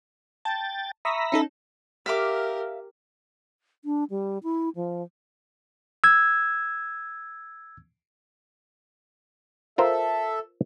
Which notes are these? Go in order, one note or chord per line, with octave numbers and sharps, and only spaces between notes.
G5 A5 A6
E5 A#5 B5 C#6 D#6
C#4 D#4 A4
G4 A#4 E5 F5 D6
D4
G3
E4
F3
E6 G#6
F4 A4 A#4 C5 E5